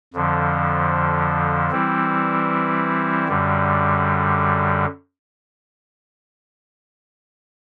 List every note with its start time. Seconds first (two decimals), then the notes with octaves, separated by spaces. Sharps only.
0.14 F2 D3 F3
1.71 E3 G3 C4 E4
3.28 F#2 D3 G3